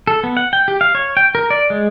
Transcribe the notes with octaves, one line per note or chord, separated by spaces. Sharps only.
A4
B3
F#5
G5
G4
F5
C#5
G5
A#4
D5
G#3